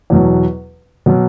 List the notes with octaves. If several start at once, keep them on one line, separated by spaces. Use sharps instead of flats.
E2 B2 F#3
B2 F#3